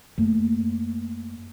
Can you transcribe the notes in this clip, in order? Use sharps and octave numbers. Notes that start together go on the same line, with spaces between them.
F#2 A3 A#3